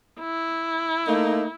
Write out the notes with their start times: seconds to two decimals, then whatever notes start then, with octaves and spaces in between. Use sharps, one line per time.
0.20 E4
1.08 A3 A#3 D#4